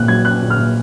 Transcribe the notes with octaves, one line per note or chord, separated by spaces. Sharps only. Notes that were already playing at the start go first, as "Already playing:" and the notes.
Already playing: A#1 A#2 F#6
F#3 G#6
C#4 F#6
A#1
F6
A#2